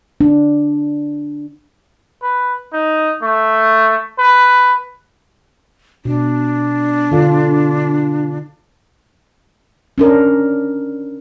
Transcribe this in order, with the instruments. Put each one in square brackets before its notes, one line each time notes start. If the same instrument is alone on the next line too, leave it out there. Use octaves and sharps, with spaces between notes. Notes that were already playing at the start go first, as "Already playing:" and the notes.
[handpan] D4
[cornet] B4
D#4
A3
B4
[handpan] B2 [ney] D4
[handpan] D3 F4 A4
C#4 D4 A#4